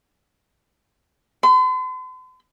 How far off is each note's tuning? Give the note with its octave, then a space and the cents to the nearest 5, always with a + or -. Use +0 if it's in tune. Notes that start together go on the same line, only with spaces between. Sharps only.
C6 -45